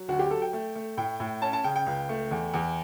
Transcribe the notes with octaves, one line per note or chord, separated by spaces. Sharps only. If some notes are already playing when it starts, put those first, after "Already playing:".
Already playing: F#3
D2 F#4
G4
F#3 A4
G5
A3
A3
A2 G5
A2
C#4 A5
A5
C#3 G5
G5
C#2
A3
E2
E2